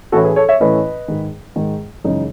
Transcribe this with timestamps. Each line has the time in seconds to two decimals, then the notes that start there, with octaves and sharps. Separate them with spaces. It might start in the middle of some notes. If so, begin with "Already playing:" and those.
0.12 A2 E3 A3 C#4 E4 F#4 A4
0.24 G#4 B4
0.36 A4 C#5
0.48 C#5 E5
0.60 A2 E3 A3 C#4 E4 B4 D#5
1.08 G#2 D#3 G#3
1.56 G#2 D#3 G#3
2.04 F#2 C#3 E3 G#3 D#4